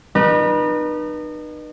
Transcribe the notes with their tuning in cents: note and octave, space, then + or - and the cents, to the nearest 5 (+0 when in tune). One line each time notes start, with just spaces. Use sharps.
D#4 -40 B4 -35